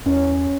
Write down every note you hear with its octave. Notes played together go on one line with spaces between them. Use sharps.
E2 C#4